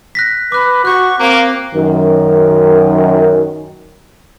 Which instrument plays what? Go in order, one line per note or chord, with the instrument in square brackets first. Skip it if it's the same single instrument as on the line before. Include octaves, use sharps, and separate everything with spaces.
[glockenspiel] F#6 A#6 B6
[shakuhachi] B4 [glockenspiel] D6 F#6
[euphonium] F#4 [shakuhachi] C#6 [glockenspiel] F#6 G6
[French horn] A#3 [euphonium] C4 [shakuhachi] F5
[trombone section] F#2 D#3